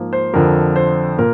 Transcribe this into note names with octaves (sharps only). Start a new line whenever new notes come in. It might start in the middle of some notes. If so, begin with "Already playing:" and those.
Already playing: G#2 F3 A#3
C5
F2 D3 F3 A#4
C5
A#2 A#4